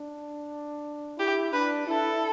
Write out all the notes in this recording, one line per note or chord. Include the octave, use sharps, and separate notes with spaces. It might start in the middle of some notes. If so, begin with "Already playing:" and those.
Already playing: D4
E4 G4
D4 B4
E4 A4